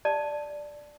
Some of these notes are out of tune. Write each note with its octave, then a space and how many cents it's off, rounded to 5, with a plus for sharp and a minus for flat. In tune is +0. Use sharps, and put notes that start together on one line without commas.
D5 +5 A5 +0